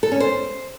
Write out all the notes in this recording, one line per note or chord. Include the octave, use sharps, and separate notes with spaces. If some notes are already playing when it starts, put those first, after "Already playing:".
A4
C#4
C5